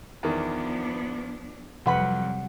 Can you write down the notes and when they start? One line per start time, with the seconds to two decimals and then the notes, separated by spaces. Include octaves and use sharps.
0.23 E2 D#3 F3 B3 D4
1.86 F2 C3 F#3 G3 B4 F#5 B5